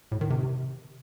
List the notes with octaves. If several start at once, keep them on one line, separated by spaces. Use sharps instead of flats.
A2
D#3
C3